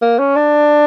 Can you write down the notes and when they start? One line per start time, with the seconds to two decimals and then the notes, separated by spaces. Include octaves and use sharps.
0.02 A#3
0.19 C#4
0.36 D4